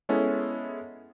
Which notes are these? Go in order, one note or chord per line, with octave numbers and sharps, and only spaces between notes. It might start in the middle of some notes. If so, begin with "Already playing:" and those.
G#3 B3 C#4 E4 A4